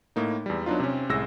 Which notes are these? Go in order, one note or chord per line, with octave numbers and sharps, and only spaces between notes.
A2 A#3 D#4
E2 G3
F#3 B3 D4 D#4 F4
C3 C4 C#4
C2 A2 G#3 E6 A#6